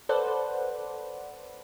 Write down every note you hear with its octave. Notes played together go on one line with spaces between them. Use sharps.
A4 B4 C5 D5 F#5